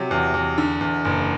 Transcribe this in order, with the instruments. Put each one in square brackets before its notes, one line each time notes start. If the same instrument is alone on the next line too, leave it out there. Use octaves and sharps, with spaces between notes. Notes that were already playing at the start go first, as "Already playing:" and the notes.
Already playing: [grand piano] C3 F#3
E2
E2
D3
E2
F#1